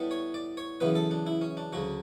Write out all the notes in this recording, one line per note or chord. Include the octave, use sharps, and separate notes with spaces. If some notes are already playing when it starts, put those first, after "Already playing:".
Already playing: A2 G3 B3
C#5
D5
C#5
F#2 C#3 E3 B3 B4
A4
D4
E4
C#4
D4
D2 C#3 F#3 F#4